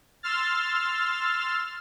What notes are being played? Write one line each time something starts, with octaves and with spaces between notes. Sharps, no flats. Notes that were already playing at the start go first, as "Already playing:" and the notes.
C6 E6 F6 A6